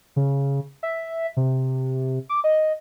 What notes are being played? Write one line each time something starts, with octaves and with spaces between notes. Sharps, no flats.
C#3
E5
C3
D6
D#5